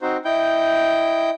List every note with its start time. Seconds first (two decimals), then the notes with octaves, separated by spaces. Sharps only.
0.02 C4 D#4 F#4 C5
0.25 E4 D#5 G5 G6